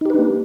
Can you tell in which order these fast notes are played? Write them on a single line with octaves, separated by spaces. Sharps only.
D#4 G4 B4 D4 A#3